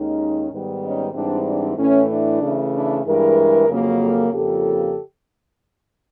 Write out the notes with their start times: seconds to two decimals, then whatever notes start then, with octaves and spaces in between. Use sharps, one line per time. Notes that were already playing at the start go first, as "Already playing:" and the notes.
Already playing: D#2 D#3 G#3 C#4 D#4
0.51 G#2 D#3 G3 B3
0.82 C#4 D#4
1.14 G#2 E3 G3 C4 D4
1.46 D4
1.77 A2 E3 A3 C#4
2.09 D4
2.41 C#3 E3 A3
2.73 D4 E4
3.05 G2 E3 G#3 G#4 A#4
3.69 F2 C#3 F#3 A#3 C#4
4.00 G4 A4
4.32 F2 C#3 F3 A#3 G4 A4